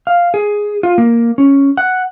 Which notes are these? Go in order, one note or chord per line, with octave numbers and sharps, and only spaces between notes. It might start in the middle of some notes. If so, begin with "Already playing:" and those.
F5
G#4
F4
A#3
C#4
F#5